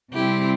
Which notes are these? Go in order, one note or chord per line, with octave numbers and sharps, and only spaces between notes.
C3 G3 C4 E4 G4